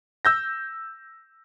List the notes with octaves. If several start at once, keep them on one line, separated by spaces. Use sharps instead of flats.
E6 G6 A#6